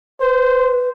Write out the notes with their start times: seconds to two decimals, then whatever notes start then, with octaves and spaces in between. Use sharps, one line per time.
0.21 B4 C5